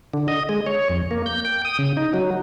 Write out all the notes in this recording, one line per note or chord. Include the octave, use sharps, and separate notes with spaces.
D3
D#5
G#3
C#5
F2
A#3
G6
G5
D#6
C#3
D#4
F#3